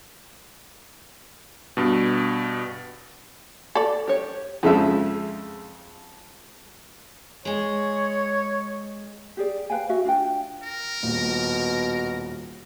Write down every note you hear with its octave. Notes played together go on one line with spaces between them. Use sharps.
G2 B2
A4 D5
G4 C#5
F2 C#3 F3 G#3 E5 E6
G#3 G#4 C#5
G4 G#4 D5
B4 F5 G5 G#5
F#4 E5 F5
D4 F4 G5
A#4
D#1 B2